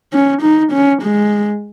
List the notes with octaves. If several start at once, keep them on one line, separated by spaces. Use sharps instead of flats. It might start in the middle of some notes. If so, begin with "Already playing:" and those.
C#4
D#4
C#4
G#3